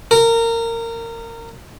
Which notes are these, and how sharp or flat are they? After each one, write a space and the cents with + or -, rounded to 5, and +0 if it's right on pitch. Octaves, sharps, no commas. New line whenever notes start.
A#4 -20